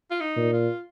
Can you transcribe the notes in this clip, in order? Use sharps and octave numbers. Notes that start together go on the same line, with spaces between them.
F4
D#4
A#2
F4